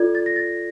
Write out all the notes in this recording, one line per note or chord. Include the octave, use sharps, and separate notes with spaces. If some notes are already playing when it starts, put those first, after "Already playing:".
Already playing: F4 A4 D5 G#6
A6
A#6
A6